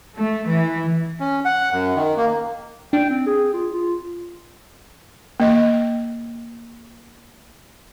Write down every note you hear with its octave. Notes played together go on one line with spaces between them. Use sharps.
A3
E3
C#4
F#5
F#2
D#3
A#3
D4 G5
C4
G#4
F4
F4
A#3 D#5